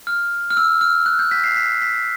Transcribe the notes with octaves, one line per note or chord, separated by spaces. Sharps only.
F6
F6
E6
F6
F#6
G6
B6
C7
B6
B6